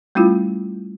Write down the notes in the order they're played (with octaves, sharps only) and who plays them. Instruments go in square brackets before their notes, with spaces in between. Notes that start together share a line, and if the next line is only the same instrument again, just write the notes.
[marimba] G3 A3 C#4 E4 F4